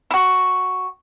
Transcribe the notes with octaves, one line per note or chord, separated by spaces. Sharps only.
E4 F#4